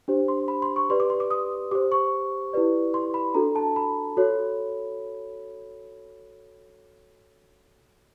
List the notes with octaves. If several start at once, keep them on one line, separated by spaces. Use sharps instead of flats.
D4 G4 C5
C6
B5
C6
C#6
G4 B4 D5 C6
D6
C6
D6
D#6
G4 C5 D6
C#6
E4 G4 B4 D5
C6
B5
D4 F#4 A4 A#5
A5
B5
F#4 A4 C#5